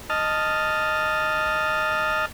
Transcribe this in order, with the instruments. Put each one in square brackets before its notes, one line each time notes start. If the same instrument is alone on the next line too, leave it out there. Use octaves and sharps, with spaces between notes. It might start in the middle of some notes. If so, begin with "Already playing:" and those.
[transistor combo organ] D#5 A5 F6